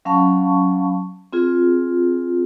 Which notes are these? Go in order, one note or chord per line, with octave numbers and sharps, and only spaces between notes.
F#3 C#4 F5 A5 B5 C#6
C4 F4 G#4